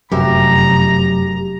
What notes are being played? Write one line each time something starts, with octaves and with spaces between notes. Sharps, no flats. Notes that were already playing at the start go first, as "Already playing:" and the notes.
F1 F#2 G4 A#4 E5 A#5